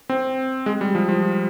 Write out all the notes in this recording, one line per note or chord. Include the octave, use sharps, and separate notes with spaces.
C4
G#3
G3
F3
F3